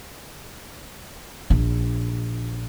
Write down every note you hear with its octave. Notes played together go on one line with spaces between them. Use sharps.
A#1 D4